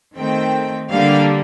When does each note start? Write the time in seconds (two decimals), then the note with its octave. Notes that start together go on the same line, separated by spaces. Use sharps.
0.17 D#3 A3 C4 G5
0.91 D3 G3 A#3 F5